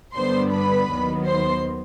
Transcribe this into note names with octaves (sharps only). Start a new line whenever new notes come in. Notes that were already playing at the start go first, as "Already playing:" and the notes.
G2 D3 G3 B3 D4 C5 C6
B4 B5
D#2 D#3 F#3 B3
C5 C6